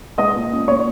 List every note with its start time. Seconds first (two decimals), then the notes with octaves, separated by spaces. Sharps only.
0.18 G#3 D#5 D#6
0.35 A#2
0.52 C#4
0.68 A#2 C#5 C#6